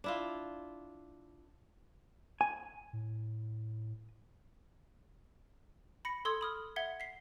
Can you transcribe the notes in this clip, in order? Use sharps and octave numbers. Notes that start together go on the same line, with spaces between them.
D4 E4 F4
G#5
A2
B5 A#6 C#7
A4 C6 D#6 E6 G#6
B5 D#6 F6
E5 F#5 G#6 G7
B6 C7